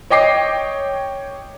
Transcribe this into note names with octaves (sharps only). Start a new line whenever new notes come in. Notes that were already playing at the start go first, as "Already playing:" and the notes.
C#5 D#5 G5 D6 C7